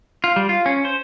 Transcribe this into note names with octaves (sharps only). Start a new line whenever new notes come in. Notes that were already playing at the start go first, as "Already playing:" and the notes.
F4
G3
F4
C#4
C5